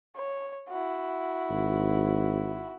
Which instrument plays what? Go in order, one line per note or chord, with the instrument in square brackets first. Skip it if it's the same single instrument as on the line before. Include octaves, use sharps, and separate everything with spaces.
[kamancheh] C#5
E4 F#4
[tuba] G#1